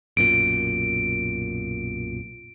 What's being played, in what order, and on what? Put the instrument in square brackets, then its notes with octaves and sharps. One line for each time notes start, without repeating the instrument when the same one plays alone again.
[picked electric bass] B1 F#2 A#2 [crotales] D7